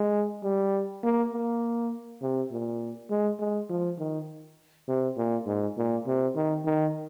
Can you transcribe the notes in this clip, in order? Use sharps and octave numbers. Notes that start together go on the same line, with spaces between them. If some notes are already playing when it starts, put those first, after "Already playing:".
Already playing: G#3
G3
A#3
A#3
C3
A#2
G#3
G#3
F3
D#3
C3
A#2
G#2
A#2
C3
D#3
D#3